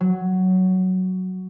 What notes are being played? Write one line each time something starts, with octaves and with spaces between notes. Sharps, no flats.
F#3